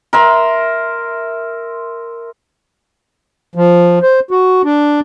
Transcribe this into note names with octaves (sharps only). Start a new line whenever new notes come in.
A#4 E5 C6
F3
C5
F#4
D4